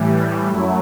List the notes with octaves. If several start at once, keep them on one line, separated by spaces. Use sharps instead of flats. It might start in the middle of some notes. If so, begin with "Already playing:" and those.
Already playing: A2 E3 G3
F#2 F#3 A3 E4